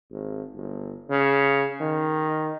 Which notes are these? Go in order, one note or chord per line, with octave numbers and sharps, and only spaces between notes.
G#1
G1
C#3
D#3